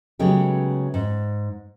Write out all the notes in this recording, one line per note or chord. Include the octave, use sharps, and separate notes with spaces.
C#3 F#3 G#3 A3 B3 G4
G#2